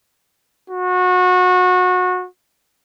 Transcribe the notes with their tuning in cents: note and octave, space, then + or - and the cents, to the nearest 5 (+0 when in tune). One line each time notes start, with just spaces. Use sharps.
F#4 -25